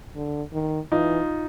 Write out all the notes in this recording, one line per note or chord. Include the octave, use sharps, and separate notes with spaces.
D3
D#3
E3 D#4 F4